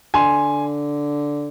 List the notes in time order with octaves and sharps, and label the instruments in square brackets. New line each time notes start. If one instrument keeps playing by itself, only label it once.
[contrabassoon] D3 [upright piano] G#5 C6